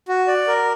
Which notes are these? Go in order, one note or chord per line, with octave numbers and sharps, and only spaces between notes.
F#4
D5
A#4